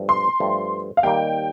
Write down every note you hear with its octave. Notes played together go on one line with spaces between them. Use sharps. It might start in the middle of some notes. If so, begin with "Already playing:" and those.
Already playing: G2 F3 A3
C6
G2 F3 A3
F5
D#2 D#3 G3 A#3 G5